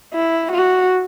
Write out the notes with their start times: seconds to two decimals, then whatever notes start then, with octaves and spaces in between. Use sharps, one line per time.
0.13 E4
0.52 F#4